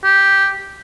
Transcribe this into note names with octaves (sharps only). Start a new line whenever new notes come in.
G4